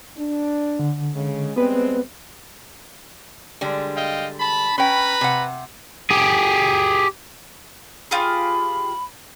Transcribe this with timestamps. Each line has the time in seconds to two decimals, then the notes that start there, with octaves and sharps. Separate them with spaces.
0.17 D4
0.79 D3
1.15 C#3 G#3
1.56 G3 G#3 B3 C4 B4
3.61 D3 G3 G#3
3.97 D#5 F5 G5
4.40 A5 B5
4.78 C#4 B4 G5 A#5 B5
5.21 C3 F#5
6.10 G4 G#4
8.11 F4 G4 G#4 B5